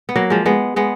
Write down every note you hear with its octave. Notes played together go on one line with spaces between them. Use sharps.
B3
F#3 A#3
F3 G#3
G#3 B3
G#3 B3